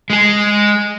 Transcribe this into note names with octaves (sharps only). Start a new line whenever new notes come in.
G#3 G#4